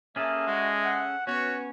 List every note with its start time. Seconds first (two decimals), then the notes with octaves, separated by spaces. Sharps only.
0.16 A#3 C#4 G#4 A4 E5
0.46 G#3 F#4
0.85 F#5
1.27 B3 C#4 F#4 C#5